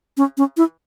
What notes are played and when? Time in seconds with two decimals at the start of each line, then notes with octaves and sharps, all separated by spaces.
0.17 C#4
0.37 C#4
0.57 E4